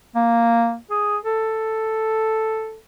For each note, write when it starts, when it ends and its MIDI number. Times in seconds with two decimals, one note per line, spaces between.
0.15 0.76 58
0.90 1.17 68
1.26 2.77 69